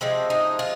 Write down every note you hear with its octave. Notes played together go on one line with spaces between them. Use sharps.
C3 F3 G#3 C4
D#4
F4